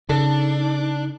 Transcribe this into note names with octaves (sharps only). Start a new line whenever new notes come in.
C#3 D4 D#4 A4